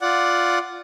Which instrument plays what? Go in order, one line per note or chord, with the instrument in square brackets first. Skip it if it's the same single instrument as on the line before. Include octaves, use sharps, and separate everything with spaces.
[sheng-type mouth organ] F4 D5 F#5